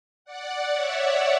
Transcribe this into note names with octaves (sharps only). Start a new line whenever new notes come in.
D5 F#5
C#5 E5